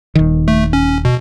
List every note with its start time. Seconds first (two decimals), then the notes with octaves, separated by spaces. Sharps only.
0.15 D#1 D#3
0.48 A3
0.73 C#4
1.05 B2